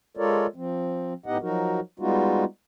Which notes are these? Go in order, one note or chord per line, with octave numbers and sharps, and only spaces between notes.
G#3 F4 A4 A#4 C#5 D5
F3 C4
A2 B3 D#4 G4 D#5 F#5
F3 F#3 D#4 F#4 A#4
G3 G#3 B3 D#4 F4 F#4